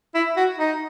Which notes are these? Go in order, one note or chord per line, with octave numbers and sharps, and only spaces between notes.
E4
F#4
D#4